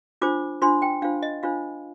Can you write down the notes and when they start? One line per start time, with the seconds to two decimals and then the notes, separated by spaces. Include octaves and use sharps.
0.21 D4 F4 C5 D6
0.62 D4 F4 C5 C6
0.82 G5
1.02 D4 F4 C5 F5
1.23 D#5
1.43 D4 F4 C5 F5